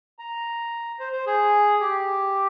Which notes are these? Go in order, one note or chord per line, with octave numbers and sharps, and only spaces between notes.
A#5
C5
C5
G#4
G4